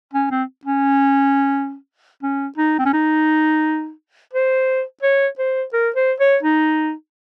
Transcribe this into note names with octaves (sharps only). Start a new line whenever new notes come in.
C#4
C4
C#4
C#4
D#4
C4
C#4
D#4
C5
C#5
C5
A#4
C5
C#5
D#4